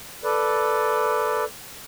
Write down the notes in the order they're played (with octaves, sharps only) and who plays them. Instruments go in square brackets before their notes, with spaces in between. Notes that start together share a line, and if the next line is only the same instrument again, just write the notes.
[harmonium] A4 B4 D5